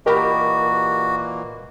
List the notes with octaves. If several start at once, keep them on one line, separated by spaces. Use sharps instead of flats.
A#2 E3 A#3 F#4 G4 A#4 D#5 B5